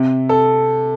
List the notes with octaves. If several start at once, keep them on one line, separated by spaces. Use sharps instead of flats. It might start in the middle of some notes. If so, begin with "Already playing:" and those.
Already playing: C3
A4